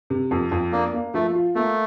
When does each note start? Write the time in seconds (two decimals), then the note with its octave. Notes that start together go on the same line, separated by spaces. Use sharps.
0.10 C3
0.31 F2
0.51 F2
0.72 A#3 D4
0.93 A#3
1.14 F3 A3
1.35 F4
1.55 A3 A#3